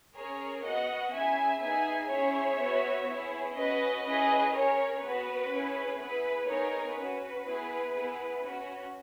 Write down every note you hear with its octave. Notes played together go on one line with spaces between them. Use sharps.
C#4 G#4 A#4 C#5
B3 F#4 D#5 F#5
C#4 E4 G#4 E5 G#5
B3 D#4 G#4 E5 G#5
C#4 E4 G#4 C#5 E5
B3 F#4
B3 E4 G#4
C#4 F#4 B4 D#5
C#4 E4 G#4 B4 D#5
C#4 G#4 A#4 C#5
B3 F#4 B4
C#4 E4 G#4
B3 E4 G#4 B4
B3 D#4 G#4 A#4 C#5
C#4 F#4 B4
B3 E4 G#4
B3 E4 G#4
C#4 F#4